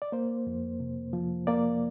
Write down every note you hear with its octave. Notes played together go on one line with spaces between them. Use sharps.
D5
A#3 C5
F2
C3
F3
A#3 D5